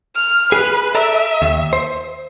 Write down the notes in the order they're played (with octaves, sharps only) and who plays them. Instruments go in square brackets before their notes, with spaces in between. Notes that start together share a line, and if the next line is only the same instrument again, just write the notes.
[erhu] F6
[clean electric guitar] G#4 [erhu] B4
[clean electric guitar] A4 D5 A#5 [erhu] E5
[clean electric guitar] D#2
C5